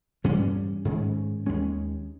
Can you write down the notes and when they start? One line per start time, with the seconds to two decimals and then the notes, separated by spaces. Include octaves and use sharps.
0.24 G2 E3 G3 C#4
0.85 G#2 D#3 G#3 C#4
1.46 D#2 D#3 G#3 C#4